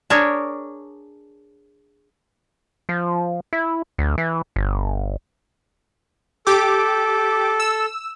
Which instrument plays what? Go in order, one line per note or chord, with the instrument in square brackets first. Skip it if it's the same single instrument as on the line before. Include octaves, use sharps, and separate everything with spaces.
[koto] D4 G#4 A#4 C#5
[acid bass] F3
E4
D2
E3
G1
[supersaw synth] G4 D6 [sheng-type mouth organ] A4
[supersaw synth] E6